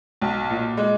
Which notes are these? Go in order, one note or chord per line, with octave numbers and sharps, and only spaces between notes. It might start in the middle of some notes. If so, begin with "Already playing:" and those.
B1
A#2
G#3